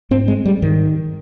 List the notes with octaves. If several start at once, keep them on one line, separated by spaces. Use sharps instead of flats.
G#2 C4
G#3
G3
G#2 D#3